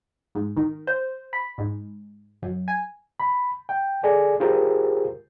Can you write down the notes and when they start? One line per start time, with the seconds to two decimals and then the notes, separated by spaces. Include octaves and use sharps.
0.35 G#2
0.57 D#3
0.87 C5
1.33 B5
1.58 G#2
2.42 F#2
2.68 G#5
3.20 B5
3.69 G5
4.03 G#4 A4 D5 G#5
4.40 F4 G4 G#4 A#4 C5